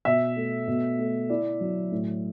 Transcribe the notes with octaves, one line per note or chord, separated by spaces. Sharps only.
B2 E5
A3
B2
A3
E4 D5
F#3
A2